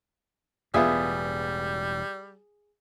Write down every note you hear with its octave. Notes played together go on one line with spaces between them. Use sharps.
E1 E2 A2 G3 B3 F4 G#4 E5